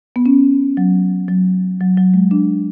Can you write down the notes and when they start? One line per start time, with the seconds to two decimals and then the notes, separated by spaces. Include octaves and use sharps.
0.16 B3
0.26 C#4
0.77 F#3
1.28 F#3
1.81 F#3
1.97 F#3
2.14 G#3
2.31 D4